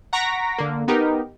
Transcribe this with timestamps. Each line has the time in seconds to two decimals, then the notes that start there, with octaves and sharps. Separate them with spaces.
0.13 F#5 A#5 C#6 A#6 B6 D7
0.58 D3 A#3
0.88 B3 D#4 G4 A#4